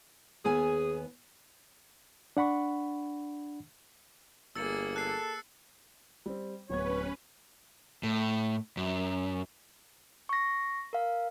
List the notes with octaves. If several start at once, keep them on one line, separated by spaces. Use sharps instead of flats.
D#2 B3 G#4 G#5
D4 F#5 B5 C#6
G1 A#3 G#4 E6 A6 C#7
A4 F#6 C7
G3 C4
D1 B3 C#4 B4 C#5 G#6
A2
F#2
C#6 A#6
A#4 F5